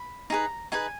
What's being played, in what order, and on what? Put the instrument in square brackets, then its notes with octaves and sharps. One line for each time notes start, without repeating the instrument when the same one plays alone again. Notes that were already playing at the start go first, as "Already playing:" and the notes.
Already playing: [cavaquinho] B5
D#4 G#4 B4 A#5
D#4 G#4 B4 G#5